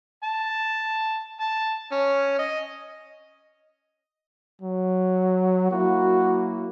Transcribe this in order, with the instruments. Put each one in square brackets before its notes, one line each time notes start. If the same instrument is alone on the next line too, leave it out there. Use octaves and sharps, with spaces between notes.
[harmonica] A5
A5
C#4
D#5
[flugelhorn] F#3
[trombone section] F#3 A#3 E4 [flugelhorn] F#4